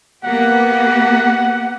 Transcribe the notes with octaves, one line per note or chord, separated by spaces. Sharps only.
A#3 B3 G4 F#5